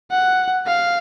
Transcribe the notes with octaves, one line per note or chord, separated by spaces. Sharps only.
F#5
F5